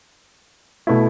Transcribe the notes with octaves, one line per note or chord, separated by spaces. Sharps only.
B2 A3 E4